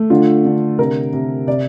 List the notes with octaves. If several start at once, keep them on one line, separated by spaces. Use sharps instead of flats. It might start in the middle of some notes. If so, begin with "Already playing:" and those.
Already playing: A3
D3 F4
D3
C3 A#4
C3
C3 D5